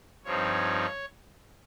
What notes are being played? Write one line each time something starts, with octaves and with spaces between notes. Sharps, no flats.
G2 F3 C4 D#4 C#5